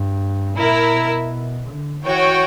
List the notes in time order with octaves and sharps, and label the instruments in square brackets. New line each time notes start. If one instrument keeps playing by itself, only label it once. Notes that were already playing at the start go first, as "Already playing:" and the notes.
Already playing: [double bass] G2
[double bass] A#2 [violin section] E4 A#4 E5
[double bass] B2
D3
[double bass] E3 [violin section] F#4 C#5 G5